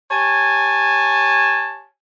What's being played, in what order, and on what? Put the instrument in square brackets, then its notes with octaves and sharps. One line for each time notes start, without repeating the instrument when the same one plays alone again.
[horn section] G4 C#5 G#5 A5